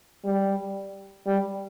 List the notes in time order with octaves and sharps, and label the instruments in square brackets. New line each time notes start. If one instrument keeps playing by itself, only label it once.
[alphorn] G3
G3